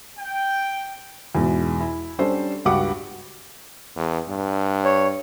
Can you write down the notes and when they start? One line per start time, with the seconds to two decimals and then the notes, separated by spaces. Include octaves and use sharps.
0.18 G5
1.35 E2 G#2 B2
1.80 E4
2.19 G3 C#4 D4 A4 C5 D5
2.65 C#2 G2 F#4 G4 F#5 D6
3.96 E2
4.29 G2
4.85 C#5